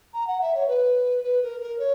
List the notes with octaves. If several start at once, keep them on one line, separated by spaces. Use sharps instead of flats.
A#5
F#5
E5
C#5
B4
B4
A#4
A#4
C#5